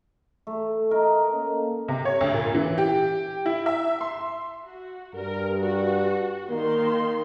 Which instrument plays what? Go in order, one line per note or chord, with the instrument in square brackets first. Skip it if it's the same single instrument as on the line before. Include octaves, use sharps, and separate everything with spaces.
[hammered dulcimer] A3
[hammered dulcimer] A#4 [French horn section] D#5
[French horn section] A#3 C#4 A4
[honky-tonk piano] C3
C#5
D2
A#2
E3
G4
E4
E5
C6
[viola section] F#4
[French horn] G2 [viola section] A#4
[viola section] F#4
[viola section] D#3 C6 [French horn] A#3